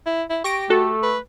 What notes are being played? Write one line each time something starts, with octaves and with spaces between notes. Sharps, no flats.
E4
E4
G4 C#6 A#6 D7
A3 F#4 A4
B4